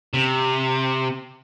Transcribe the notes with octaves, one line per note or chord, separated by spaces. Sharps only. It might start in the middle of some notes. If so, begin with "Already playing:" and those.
C3